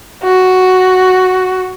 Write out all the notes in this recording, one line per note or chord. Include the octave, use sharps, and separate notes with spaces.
F#4